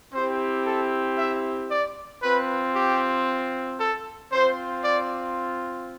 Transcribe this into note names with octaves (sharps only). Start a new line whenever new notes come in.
C4 E4 G4 C5
A4
E5
D5
C4 F4 B4
G4
A4
C4 F4 C5
D5